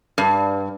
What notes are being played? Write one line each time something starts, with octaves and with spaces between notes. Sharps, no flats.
G2